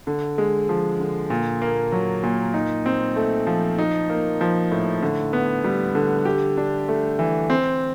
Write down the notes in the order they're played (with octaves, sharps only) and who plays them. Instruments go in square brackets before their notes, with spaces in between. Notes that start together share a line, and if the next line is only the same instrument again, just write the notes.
[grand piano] D3
G#3
F3
D3
A#2
A#3
F#3
A#2
D#4
C4
A3
F3
D#4
A#3
F3
A2
D3
B3
G3
D3
G4
D4
A3
E3
C4